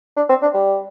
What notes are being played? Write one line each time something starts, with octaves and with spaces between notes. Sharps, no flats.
D4
C4
D4
G3